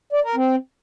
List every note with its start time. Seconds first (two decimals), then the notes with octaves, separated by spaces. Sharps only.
0.13 D5
0.24 A#4
0.35 C4